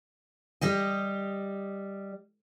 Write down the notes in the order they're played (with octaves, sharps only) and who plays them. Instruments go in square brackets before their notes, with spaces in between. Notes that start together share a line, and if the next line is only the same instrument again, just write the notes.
[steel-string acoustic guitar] G3 G4 D#5